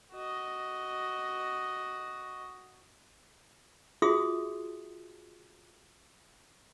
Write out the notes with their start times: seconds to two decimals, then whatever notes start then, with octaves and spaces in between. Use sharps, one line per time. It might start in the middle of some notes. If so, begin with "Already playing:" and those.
0.13 F#4 D#5
4.02 F4 F#4 G#4 E5 C6 D#6